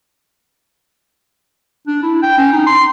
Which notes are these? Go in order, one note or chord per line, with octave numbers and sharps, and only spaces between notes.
D4
E4
G5
C#4
D#4
C6